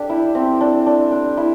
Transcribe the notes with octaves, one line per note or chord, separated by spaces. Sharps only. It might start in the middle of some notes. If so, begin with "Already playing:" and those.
Already playing: D4 G4 A4
E4
C4
D4
D4
D4
E4